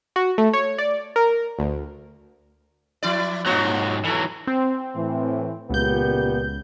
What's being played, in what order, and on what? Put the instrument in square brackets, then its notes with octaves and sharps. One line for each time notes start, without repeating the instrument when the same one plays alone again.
[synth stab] F#4
A3
C#5
D5
A#4
D2
[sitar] F3 E4 D5
[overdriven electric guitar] G#2 F#3 [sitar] A#3 F4 F#4
[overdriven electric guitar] E3 F#3 [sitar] A4
[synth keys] C4
[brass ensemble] A2 E3
[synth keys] C#2 G6 [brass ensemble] A#2 B3 G4